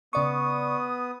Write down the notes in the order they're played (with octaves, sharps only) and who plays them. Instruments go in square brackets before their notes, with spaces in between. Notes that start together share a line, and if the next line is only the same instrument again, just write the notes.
[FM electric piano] C#3 D5 C#6 [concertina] B3 D#6